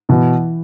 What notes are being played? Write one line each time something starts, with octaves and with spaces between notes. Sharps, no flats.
B2 E3